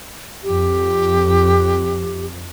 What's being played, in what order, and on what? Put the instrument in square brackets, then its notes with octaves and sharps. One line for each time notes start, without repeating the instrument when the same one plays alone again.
[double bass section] F2 [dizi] G4